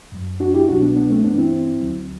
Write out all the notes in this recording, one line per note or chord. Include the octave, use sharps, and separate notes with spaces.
F#2 F#3
D4 F#4
E4 G4
C2 B2 F#3 D4 F#4
B3 D4
B3 D4
A3 C4
G2 E3 B3 D4
C4 E4
D2 D3 F#3